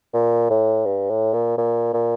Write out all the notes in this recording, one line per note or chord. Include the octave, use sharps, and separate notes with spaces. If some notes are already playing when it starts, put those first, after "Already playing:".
A#2
A2
G2
A2
A#2
A#2
A#2